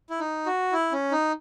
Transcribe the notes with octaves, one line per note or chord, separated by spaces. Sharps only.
E4
D#4
F#4
E4
C#4
D#4